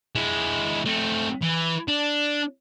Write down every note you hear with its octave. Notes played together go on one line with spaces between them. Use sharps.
G#3 E4
A3 C4
E3
D4